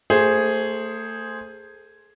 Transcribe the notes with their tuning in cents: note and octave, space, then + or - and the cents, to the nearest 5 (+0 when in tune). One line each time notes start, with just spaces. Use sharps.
A3 +25 G#4 +0 C5 +5